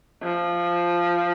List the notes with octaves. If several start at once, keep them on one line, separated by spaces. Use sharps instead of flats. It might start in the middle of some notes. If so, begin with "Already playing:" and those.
F3